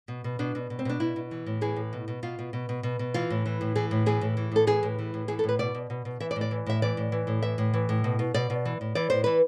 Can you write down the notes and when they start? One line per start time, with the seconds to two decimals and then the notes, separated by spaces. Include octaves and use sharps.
0.08 B2
0.24 B2
0.39 B2 D4
0.55 B2
0.70 B2
0.79 C4
0.85 B2 D4
1.00 B2 E4
1.16 B2
1.31 E3
1.46 A2
1.61 E3 G#4
1.76 A2
1.93 B2
2.08 B2
2.23 B2 F4
2.39 B2
2.53 B2
2.69 B2
2.83 B2
2.99 B2
3.14 E3 F4
3.30 A2
3.46 E3
3.61 A2
3.76 E3 G#4
3.91 A2
4.06 E3 G#4
4.21 A2
4.37 E3
4.52 A2 A4
4.67 E3 G#4
4.83 A2
4.99 E3
5.14 A2
5.28 E3 G#4
5.39 A4
5.44 A2 B4
5.59 B2 D5
5.75 B2
5.90 B2
6.05 B2
6.20 E3 E5
6.31 D5
6.36 A2
6.41 D5
6.51 E3
6.66 A2 E5
6.82 E3 D5
6.97 A2
7.12 E3
7.27 A2
7.42 E3 E5
7.58 A2
7.74 E3
7.89 A2
8.04 B2
8.19 B2
8.34 B2 D5
8.50 B2
8.65 E3
8.81 A2
8.95 E3 D5
9.10 A2 C5
9.24 E3 B4